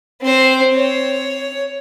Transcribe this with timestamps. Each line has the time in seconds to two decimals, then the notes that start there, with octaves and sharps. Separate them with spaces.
0.22 C4 C5
0.75 C#5